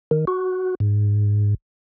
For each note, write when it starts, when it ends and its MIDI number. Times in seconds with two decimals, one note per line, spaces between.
0.11 0.25 51
0.27 0.75 66
0.80 1.54 44